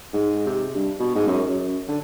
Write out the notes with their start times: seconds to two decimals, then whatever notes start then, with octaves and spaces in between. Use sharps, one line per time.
0.13 G#2
0.46 C3
0.75 G2
0.99 B2
1.15 G#2
1.27 F#2
1.48 F#2
1.88 D3